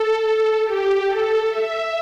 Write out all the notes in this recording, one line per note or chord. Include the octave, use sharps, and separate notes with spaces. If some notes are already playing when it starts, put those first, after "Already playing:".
Already playing: A4
G4
A4
E5